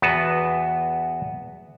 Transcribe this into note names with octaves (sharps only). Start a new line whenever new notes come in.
E2 B3 F#4 B4 A5